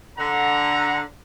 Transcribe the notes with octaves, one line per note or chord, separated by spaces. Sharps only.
D3 F#5 A#5